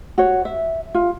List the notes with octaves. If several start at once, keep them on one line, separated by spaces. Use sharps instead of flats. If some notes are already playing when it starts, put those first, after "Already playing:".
F#4 C#5
E5
F4